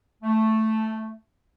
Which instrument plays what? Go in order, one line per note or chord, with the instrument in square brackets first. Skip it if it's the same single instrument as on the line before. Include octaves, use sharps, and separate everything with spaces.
[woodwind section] A3